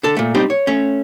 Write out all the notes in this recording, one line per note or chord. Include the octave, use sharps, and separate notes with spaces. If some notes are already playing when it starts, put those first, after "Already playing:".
D3 A4
A#2 A3
G3 C4 D#4 G4
C#5
A3 C#4